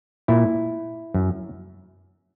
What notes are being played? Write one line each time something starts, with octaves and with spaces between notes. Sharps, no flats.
A#2 E4
F#2